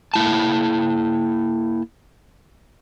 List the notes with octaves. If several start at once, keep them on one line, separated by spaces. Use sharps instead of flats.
A#3 E4 A5